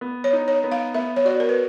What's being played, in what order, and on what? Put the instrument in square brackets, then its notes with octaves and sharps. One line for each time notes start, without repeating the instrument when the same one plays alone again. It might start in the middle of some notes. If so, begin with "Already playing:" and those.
[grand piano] B3
[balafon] C#5
[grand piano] D#4
[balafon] C#5
[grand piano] B3
[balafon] F5
[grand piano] B3 [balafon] E5
[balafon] C#5
[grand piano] F#4 [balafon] D5
[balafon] A#4
B4